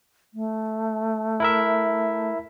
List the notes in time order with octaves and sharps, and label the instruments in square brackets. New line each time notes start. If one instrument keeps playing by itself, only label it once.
[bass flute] A3
[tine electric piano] E4 A#4 E5